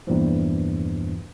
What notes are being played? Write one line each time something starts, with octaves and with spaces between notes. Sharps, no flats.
E2 G2 A#2 E3 F3